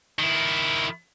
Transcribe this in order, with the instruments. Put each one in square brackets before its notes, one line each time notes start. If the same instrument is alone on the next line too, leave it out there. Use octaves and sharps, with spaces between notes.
[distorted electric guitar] D#3 E4